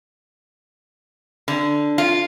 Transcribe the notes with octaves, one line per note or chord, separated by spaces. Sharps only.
D3
F4